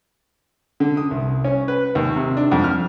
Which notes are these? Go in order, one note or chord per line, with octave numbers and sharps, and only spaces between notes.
D3
D#6
C2
C#4
B4
D#2
C3
D4
F2
F6